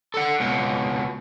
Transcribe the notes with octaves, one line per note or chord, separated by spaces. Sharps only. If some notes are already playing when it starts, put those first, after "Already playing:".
A4 F#5
C#2 B2